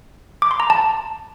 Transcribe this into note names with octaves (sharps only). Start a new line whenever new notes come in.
D6
C6
A#5
A5